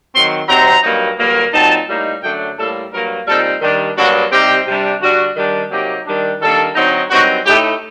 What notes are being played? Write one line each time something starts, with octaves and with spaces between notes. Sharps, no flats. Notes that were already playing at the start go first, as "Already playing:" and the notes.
D#3 F#3 C4 C6
C3 F#3 C4 D#4 A#5
G2 F#3 A#3 D#4
G2 D3 F#3 A#3
A#2 F#3 C4 D#4 A5
A2 G3 A#3 D#4
F#2 D3 F#3 A3 D4 G5
A2 G3 A#3 A4
G2 F#3 A#3 A#4
A#2 G3 C4 D#4 A4
D#3 G3 D4
G2 F#3 A#3 D4 F#4
C3 G3 C4 D#4 G4
C3 G3 D4
D3 G3 D4 F#4
D#3 G3 D4
C3 F#3 A#3 D#4 G4
D#3 G3 D4
D#3 G3 A#3 D4 A4
D3 F#3 C4 D#4
G2 F#3 C4 D#4 F#4
A2 A3 D#4 G4